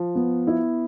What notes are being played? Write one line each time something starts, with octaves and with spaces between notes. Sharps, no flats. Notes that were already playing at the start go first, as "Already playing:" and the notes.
Already playing: F3
B3
E4